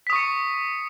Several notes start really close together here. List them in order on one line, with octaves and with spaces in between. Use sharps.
B6 D#6 C#6 C#7